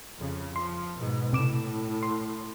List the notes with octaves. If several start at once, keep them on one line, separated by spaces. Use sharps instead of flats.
F2 C#3
F3 C6
G#2 B2
A2 C3 D6 E7
C6